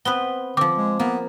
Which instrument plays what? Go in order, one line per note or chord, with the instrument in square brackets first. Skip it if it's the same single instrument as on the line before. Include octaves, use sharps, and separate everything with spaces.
[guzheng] B3 C4 B4 [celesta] G7
[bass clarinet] D3 [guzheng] F3 C4 [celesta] D6
[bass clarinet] G#3
[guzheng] A#3 [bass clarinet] B3